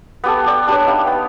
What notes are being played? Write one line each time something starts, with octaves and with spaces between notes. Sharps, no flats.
B3 G4 A4
G4 D5 C#6
D4 G4 B4 C#5
D#4 F5 G5 B5
B3